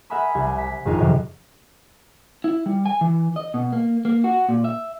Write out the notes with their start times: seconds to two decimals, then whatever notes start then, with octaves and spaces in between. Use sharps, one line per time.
0.10 A#4 E5 F#5 G#5 B5 D#6
0.35 C2 G#6
0.58 B6
0.85 G#1 F2 D#4 A#4
0.98 F#2 A2 C3 D#3 F3 F#3
2.44 E4
2.66 G3
2.86 G#5
3.01 E3
3.36 D#5
3.54 B2
3.72 A#3
4.05 A#3
4.24 F#4
4.49 A#2
4.64 E5